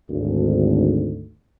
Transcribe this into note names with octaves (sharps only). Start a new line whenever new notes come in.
G#1 D2